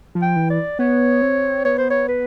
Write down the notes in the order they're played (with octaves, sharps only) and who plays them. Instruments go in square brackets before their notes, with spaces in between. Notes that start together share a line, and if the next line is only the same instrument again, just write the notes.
[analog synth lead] F3
[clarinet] G5
[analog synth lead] E3
[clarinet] D5
[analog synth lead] B3 [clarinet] C#5
[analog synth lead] C4
[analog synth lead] B3 [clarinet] C#5
[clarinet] C5
C#5
B4